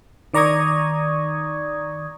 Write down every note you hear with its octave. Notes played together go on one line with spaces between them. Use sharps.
D#3 D5 A#5 C#6 D#6 G#6